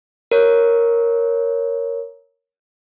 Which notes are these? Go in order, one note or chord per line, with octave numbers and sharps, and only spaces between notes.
A#4 C#5